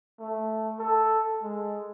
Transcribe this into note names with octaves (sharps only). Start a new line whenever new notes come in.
A3
A4
G#3